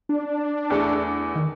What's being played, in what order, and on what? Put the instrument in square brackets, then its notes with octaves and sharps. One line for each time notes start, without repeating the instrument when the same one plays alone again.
[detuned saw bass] D4
[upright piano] E2 A3 A4
[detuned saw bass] D#3